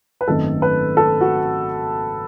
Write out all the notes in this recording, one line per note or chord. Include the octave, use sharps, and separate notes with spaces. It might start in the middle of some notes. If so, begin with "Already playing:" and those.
B4
G#1 F#2 D#3 A3 A4
B4
A4
F#4